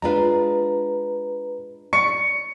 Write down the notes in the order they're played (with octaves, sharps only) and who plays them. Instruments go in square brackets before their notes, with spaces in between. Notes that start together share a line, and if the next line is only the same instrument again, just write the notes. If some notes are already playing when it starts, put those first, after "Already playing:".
[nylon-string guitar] G#3 D4 F4 [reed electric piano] B4 A#5
[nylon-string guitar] D5 [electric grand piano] C#6 [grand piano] C#7